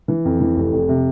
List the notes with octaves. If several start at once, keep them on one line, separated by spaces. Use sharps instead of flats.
E3
F2
E3
F1
F2
C3